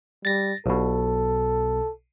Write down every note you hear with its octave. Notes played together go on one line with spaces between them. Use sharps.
G3 A6 A#6
B1 B2 A4